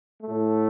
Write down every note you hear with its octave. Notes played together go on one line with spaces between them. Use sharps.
A3
A2